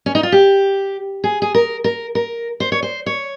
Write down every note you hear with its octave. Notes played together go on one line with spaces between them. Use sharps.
C#4
D#4
F4
G4
G#4
G#4
A#4
A#4
A#4
C5
C#5
C5
C#5